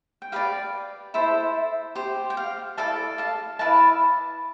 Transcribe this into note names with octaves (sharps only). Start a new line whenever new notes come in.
G5
G4 B4 D5 F5
E4 A4 C5 E5
G4 C5
G5
F5
E4 A4 D5 F5 A5
F5 A5
E4 B4 D5 F5 A5